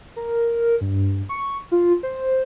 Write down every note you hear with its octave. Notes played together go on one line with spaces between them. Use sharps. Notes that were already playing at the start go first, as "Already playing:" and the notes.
A#4
G2
C#6
F4
C5